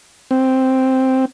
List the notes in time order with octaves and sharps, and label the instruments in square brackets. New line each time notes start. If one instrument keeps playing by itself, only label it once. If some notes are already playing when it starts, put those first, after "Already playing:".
[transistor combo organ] C4